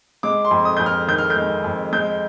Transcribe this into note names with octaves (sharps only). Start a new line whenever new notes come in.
G#3 D6
C6
F2
D#6
F2 G6
F6
D#3 G6
F6
G6
G#3
F2
G#3 G6